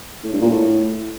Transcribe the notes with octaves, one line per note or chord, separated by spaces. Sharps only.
A2
G2
A#2
A2